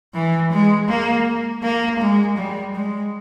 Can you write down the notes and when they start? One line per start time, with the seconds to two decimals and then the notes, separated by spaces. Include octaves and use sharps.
0.14 E3
0.52 G#3
0.88 A#3
1.62 A#3
2.00 G#3
2.37 G3
2.74 G#3